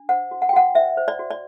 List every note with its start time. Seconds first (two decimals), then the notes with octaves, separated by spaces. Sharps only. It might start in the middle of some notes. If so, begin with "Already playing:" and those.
Already playing: D4
0.09 C5 F#5
0.31 F#4
0.42 F#5
0.49 G5
0.53 F#4 F#5
0.75 C5 E5
0.97 C5
1.08 D5
1.19 F#4
1.31 D5